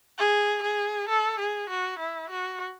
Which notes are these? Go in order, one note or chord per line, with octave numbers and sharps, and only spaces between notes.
G#4
G#4
A4
G#4
F#4
E4
F#4